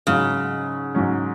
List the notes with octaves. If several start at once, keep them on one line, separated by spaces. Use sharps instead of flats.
G#2 C#3 F#3 C#4
G#2 F#3 C#4